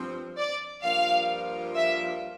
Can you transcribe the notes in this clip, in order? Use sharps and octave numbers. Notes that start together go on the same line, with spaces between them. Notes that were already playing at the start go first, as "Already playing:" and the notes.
Already playing: G2 F3 C4
D5
G2 F3 A#3 D4 F4 F5
E5